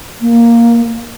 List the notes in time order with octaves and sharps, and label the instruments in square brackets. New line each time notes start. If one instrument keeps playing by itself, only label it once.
[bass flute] A#3